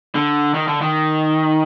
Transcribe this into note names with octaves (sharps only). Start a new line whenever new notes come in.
D3
D#3
D3
D#3